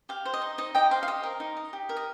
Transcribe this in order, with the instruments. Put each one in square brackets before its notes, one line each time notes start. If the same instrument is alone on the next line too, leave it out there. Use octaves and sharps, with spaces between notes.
[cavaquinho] G4 F5
C5
D#5
D#4
D#4 D#5
G4 D#5 G5
C5 F5
F5
G4 D#5
A#4
D#4
D#5
G4
A#4
D#5